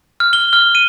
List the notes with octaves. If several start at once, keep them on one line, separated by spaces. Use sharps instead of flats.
F6
G7
F6
D#7